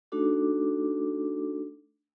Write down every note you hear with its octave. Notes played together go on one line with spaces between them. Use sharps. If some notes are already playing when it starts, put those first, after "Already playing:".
A3 D4 D#4 F#4 A4 D6